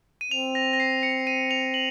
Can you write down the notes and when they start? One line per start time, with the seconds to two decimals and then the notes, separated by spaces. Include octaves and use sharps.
0.21 D#7
0.31 C4 F7
0.55 A#6
0.73 A#6
0.80 C7
1.03 C#7
1.27 D#7
1.51 F7
1.74 F#7